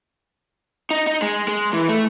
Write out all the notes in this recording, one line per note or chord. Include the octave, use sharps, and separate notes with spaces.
D#4
D#4
G#3
G#3
E3
A3